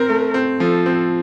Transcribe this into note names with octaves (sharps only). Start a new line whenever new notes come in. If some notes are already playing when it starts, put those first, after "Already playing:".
Already playing: C4 A#4
A3
C4
F3 A4
C4